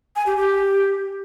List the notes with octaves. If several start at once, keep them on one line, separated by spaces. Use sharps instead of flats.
G#5
G4
G4